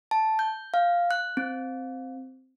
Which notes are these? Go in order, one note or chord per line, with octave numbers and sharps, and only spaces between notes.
A5
G6
F5
F#6
C4